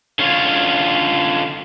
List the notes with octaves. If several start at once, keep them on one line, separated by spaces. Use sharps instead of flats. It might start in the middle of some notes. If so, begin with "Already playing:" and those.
D3 C#4 F4 C#5